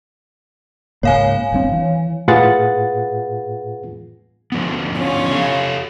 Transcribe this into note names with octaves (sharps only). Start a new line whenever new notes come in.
C#2 G#2 A#3 C#5 F5 G#5
G1 G2 C4
E3
A2 F4 G#4 B4 F#5 A6
D3 F3 B3
C#4 F4
G4 A4 F5